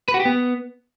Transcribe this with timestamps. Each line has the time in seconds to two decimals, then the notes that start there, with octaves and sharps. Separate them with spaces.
0.08 B4
0.14 F#4
0.20 G4
0.25 B3